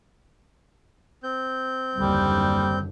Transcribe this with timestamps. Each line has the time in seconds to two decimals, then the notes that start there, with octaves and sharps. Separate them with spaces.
1.23 C4 G6
1.96 F#1 D#2 D3 G3